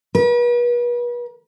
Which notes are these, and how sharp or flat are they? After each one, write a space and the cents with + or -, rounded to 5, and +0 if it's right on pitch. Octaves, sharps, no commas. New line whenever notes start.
B4 -40